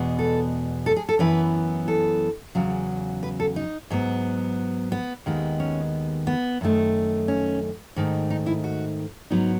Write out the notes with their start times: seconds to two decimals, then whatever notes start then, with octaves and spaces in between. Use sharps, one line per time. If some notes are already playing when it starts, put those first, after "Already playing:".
Already playing: E2 B2 G#3 B3
0.19 A4
0.86 A4
0.96 G#4
1.09 A4
1.19 F#2 E3 B3 B4
1.88 A4
2.55 E2 C#3 F#3
3.23 B4
3.40 A4
3.56 D#4
3.90 G#2 F#3 B3
4.92 B3
5.26 D#2 D#3 G#3 B3
5.60 C#4
6.27 B3
6.61 F#2 D#3 A3
7.28 C#4
7.96 G#2 D#3 A3
8.30 D#4
8.46 E4
8.64 F#4
9.30 G#2 F#3 B3 D#4